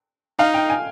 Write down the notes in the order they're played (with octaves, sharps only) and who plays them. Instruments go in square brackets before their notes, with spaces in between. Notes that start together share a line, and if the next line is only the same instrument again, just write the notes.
[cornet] D#4 [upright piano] F5
[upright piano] G5
G#5